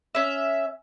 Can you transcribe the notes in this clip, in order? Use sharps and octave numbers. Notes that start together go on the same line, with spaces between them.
C#4 E5